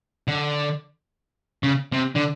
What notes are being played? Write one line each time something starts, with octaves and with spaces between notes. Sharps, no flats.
D3
C#3
C3
D3